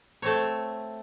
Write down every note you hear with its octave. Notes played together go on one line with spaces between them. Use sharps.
A3 C4 C#5